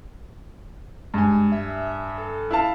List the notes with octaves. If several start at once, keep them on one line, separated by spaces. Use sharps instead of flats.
G2 G#3 G#5
E5
A4
E4 F5 A5